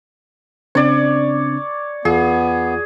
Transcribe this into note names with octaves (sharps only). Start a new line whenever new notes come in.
C#3 C4 D4 C#5 D5
E2 B3 F4 G#4